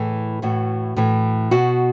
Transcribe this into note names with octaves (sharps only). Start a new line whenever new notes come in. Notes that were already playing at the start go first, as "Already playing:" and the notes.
Already playing: A2 E3 G#4
A2 E3 F#4
A2 E3
B2 F#4